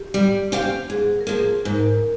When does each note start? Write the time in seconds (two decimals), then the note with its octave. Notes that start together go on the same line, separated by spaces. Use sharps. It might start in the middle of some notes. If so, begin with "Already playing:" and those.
Already playing: G4
0.14 G3
0.52 C#4 G4 C5 F5
0.90 G#2 G#4
1.21 A#4
1.27 F3 A#3 G#4
1.65 G#2 A#4